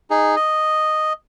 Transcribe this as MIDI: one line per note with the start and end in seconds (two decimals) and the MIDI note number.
0.10 0.36 63
0.10 0.36 68
0.36 1.13 75